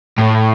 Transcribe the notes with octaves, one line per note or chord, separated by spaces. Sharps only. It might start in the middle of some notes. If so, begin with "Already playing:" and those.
A2